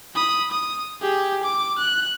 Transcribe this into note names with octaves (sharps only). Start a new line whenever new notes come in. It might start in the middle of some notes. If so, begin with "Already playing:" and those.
B5 D#6
D#6
G4 G#4
D6
F#6